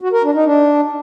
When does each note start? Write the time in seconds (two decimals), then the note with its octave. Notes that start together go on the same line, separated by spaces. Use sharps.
0.01 F#4
0.12 A#4
0.23 D4
0.34 D#4
0.45 D4